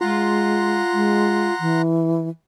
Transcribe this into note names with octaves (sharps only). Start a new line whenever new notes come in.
G#3 F4 F#5 A#5 C6
G#3
E3